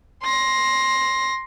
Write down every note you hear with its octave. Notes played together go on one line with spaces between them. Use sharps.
C6 A#6